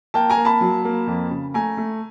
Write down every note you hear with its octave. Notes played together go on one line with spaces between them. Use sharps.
A#3 G5 A5
G#5 A#5
A#3
A5 B5
F#3
A#3
F2
C#3
A3 G#5 A#5
A3